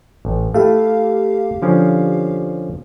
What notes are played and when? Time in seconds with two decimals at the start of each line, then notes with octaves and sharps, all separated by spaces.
0.25 A1
0.54 A3 E4 G4 F5
1.62 D3 F3 C#4